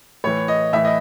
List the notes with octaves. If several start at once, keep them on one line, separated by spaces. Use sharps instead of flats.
A2 E3 C#5
D#5
A2 E3 E5
D#5